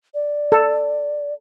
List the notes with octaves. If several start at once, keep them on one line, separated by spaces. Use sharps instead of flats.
D5
A4